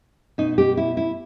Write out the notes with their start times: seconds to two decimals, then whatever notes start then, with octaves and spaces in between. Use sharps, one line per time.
0.38 B2 D#4
0.58 G4
0.77 E4
0.97 E4